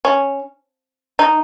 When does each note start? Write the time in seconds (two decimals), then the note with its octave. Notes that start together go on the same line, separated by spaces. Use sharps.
0.05 C#4
1.19 D#4